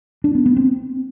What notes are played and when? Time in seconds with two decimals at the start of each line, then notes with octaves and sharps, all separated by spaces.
0.24 D4
0.35 B3
0.46 B3
0.57 C4